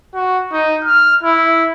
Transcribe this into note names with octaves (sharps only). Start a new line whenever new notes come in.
F#4
D#4
F6
E4